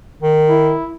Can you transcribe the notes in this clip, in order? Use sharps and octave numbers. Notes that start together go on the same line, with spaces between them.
D#3
E4